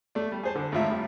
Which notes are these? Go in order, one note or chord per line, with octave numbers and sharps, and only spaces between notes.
A3 D5
G3
G#4 C5 A5
D3
G#1 A2 F4 E5
A2 G3